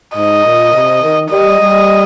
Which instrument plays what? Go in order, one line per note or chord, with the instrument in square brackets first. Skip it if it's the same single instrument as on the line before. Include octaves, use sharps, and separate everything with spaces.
[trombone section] G#2 [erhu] D#5
[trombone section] A#2
C3
D#3
[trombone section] G3 [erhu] D#5
[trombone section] G3